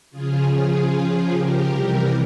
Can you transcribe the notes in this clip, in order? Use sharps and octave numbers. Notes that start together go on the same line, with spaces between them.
C#3 F3 F4 G#4
F4 G#4
G4 A#4
C3 E3 G3